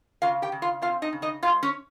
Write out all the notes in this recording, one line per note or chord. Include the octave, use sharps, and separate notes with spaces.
C#3 F4 F5
G4 G5
C#3
F4 F5
C4 F4 F5
D#4 D#5
C#3
D#4 D#5
G#2 F4 F5
C#4 C#5